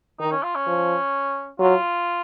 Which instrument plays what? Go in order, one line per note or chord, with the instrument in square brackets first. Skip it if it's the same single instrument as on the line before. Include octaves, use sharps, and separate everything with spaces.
[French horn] D#3 [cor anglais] D#4
[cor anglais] C#4
F4
C#4
[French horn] F3
[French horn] F#3 [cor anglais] F4